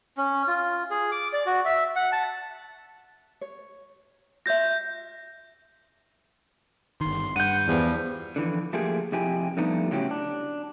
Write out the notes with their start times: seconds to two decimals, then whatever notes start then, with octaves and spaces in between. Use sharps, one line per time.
0.17 C#4
0.47 F4
0.91 G#4
1.12 D6
1.33 D5
1.46 F#4
1.65 E5
1.96 F#5
2.12 A5
3.41 C#5
4.46 F4 C#5 E5 G6 A#6
7.01 G1 D#3 C6
7.36 G2 F#5 G6 D#7
7.67 E2 F3 G3
8.36 D3 E3 F3
8.73 F3 A3 A#3 F4 G4 G#4
9.12 F2 C3 E4 G4 G#5
9.57 D3 F3 G3 A3 B3 D#4
9.91 A2 C#3 F#3 C#4 E4 G4
10.11 D4